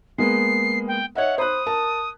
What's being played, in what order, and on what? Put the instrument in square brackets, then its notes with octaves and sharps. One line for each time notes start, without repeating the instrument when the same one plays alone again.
[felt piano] G#3 A#3 B3 [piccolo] C7
[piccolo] G5
[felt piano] C#5 D#5 E5 [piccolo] F#5
[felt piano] C5 B5 F#6 [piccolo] D#6
[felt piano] A#4 A5